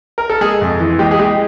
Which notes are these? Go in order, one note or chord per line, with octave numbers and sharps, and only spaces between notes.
A#4
A4
G#3 G#4
F2
E3
G#3 G4
G#4
G#3 G4